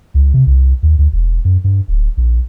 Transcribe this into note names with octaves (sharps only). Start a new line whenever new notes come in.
C#2
C3
C2
D#2
D2
E1
F#2
G2
D1
A#1